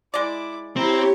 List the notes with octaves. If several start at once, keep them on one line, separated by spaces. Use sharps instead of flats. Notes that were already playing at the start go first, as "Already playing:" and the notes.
G#3 E4 D5 D6
C4 E4 G4 C#5 A#5